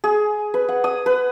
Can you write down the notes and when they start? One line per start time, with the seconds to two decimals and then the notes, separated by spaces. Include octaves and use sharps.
0.04 G#4
0.54 B4
0.69 F#5
0.84 D#6
1.06 B4